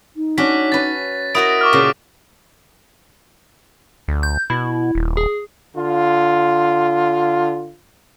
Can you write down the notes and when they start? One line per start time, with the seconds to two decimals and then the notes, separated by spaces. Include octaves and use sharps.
0.16 D#4
0.38 C#4 D4 F#4 B6
0.72 C#4 B4 A6
1.35 E4 F#4 A#4 D#5 D#6 D7
1.61 C#6 D6 F6
1.73 A#2 C#3 A3
4.08 D2
4.23 G6
4.50 B2 E4
4.95 D#1
5.17 G#4
5.76 D3 F4